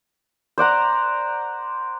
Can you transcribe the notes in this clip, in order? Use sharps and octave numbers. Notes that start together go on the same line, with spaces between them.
C5 D5 F#5 A#5